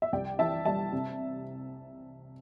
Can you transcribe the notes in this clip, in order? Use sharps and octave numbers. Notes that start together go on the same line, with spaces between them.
E5
C2 D5 G5
E3 E5 A5
G3 E5 A5
C3